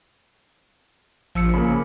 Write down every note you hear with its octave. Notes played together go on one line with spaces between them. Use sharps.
A1 F3 E6 C#7
C#3 A#3 B5